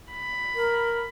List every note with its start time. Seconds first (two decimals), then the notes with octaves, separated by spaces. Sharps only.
0.13 B5
0.55 A#4